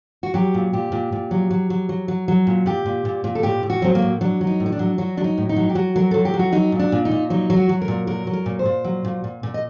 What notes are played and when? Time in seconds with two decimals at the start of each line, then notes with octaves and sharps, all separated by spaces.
0.23 F#4
0.34 F#3 G4
0.54 A#2
0.73 A#2 G4
0.92 A#2
1.12 A#2
1.31 F#3
1.51 F#3
1.70 F#3
1.89 F#3
2.08 F#3
2.28 F#3
2.47 A#2
2.66 A#2 G4
2.86 A#2
3.05 A#2
3.24 A#2
3.35 A4
3.43 A2 G4
3.63 A2
3.70 F#4
3.82 F#3 C4
3.95 A#3
4.02 A2
4.21 F#3 D4
4.41 F#3
4.47 D#4
4.60 A2
4.66 D#4
4.72 D4
4.79 F#3
4.98 F#3 F#4
5.17 F#3 D4
5.24 D#4
5.38 A2
5.49 D#4
5.56 F#3
5.70 G4
5.75 F#3 F#4
5.96 F#3 A#4
6.11 F#3 A4
6.25 G4
6.34 F#3
6.39 F#4
6.52 F#3 D#4
6.72 A#2
6.79 D4
6.92 A#2
7.05 D#4
7.11 A#2
7.30 F#3 D#4
7.50 F#3
7.56 F#4
7.69 F#3
7.82 A#4
7.88 A#2
8.07 F#3 A#4
8.27 F#3
8.33 A#4
8.46 A#2
8.59 C5
8.65 A#2
8.84 F#3
9.05 A#2
9.24 A#2
9.43 A#2
9.54 D#5